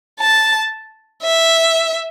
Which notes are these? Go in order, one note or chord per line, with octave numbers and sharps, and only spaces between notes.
A5
E5